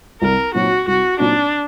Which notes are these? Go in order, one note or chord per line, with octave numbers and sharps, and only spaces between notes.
C2 A#4
A#2 F#3 C4 D#4 F#4
C2 F#4
A#2 F#3 C4 D4 D#4